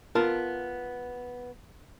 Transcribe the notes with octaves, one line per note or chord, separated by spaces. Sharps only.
B3 F4 A#4 A5